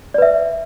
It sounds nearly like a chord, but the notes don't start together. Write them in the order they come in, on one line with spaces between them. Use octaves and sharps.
D5 B4 E5